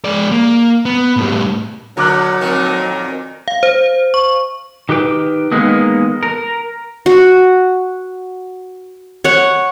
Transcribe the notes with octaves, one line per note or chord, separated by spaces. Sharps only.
G#3 D5
A#3
B3
A2 G3
A#2 D3 F#3 A#5 D6 F#6
F2 A#2 D#3
F5
C5
C#6
D#3 G4 B4 G5
D#3 E3 G#3 A#3 B3
A#4
F#4
C#5 F#5